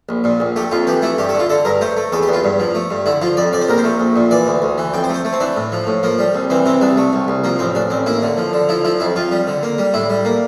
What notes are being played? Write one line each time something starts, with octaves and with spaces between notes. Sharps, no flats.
A#1
A#2
A#1
A3 G4
F2 F4
E3 G4
A3 E4
G2 G4
A4
D3
F4
D3 A4
G2 A#4
A3 C5
A3
E2 A4
G4
E2
F4
G2
F3
A3
G2
D3 E4
F3 F4
F2 D5
F2 D5
C5
A#1 A#4
C5
A3
A#1
A#2
E3 D5
D2
D2
E3
F2 G5
C5
A3
C5
A3
C4
E3 D4
A2
F3
A2
F3 A#3
G3
C2
E3 C4
C3 C4
C2 D4
A3
C2
C2
F3 A#3
A1 C4
A1 D4
A1 C4
A#3 E4
D3
F3
D3
F3 E4
F3 E4
F2 E4
F2 F4
G3
D3
A#3
G3
A2 E4
G3
A#3